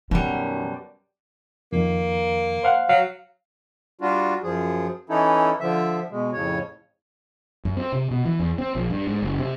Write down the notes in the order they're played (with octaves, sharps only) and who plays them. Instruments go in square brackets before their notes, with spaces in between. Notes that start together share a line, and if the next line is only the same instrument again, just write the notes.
[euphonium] F#2 [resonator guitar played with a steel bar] B2 G3 [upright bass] D#3
[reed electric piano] F2 D#3 [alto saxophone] A#3
[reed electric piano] C5 F5 F#5
[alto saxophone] F#3 [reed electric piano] F5
[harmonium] G3 D4 F4 F#4
F#2 F3 G#4
E3 C#4 D#4 E4 A4
D3 F3 E5
B2 G#3
F2 A2 C#3 C#5
[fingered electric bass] F#2
C4
C3
B2
E3
E2
C4
A#1
G2
G#2
F#1
C3